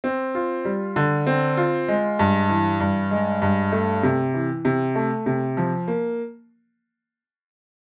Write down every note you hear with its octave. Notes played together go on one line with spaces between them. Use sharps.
C4
F4
G3
D3
C4
F4
G#3
G2
E3
G2
G#3
G2
A3
C3
E3
C3
A3
C3
F3
A#3